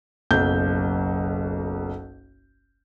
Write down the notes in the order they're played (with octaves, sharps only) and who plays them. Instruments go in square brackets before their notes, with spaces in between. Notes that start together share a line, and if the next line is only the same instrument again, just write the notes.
[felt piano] F#1 B1 G6